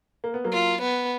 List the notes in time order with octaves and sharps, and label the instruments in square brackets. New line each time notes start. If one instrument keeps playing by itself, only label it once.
[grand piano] A#3
B3
F#3 A#3
[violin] F4
B3